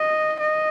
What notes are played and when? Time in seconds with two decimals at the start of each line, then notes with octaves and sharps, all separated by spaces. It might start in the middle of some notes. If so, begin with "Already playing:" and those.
Already playing: D#5
0.40 D#5